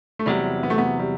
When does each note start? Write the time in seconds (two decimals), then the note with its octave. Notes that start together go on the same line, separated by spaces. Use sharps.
0.19 A3
0.26 E2 C3 F#3 G3
0.63 B3
0.70 A3
0.78 B3
0.99 G3